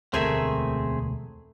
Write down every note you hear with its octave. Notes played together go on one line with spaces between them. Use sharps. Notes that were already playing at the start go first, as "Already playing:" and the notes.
E1 D2 A3 C4 G#4 A#4 E5 G#5